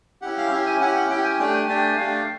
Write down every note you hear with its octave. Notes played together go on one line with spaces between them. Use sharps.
C#4 E4 G4 F#5
F5
C#4 E4 G4 E5
G#5
C#4 E4 G4 F#5
F#5
C#4 E4 G4 G5
G#5
A3 D4 G4 G5
G#5
A3 D4 G4
A3 D4 G4 F5